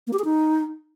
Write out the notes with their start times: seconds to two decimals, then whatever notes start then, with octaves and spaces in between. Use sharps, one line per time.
0.07 A#3
0.13 G4
0.19 G#4
0.25 D#4